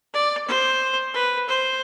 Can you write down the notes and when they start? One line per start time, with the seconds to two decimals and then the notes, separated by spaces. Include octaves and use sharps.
0.14 D5
0.48 C5
1.14 B4
1.49 C5